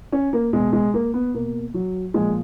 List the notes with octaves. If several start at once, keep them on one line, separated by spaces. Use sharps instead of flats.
C#4
A#3
B2 G#3
G#3
A#3
B3
B2 A#3
F#3
A#2 F3 G#3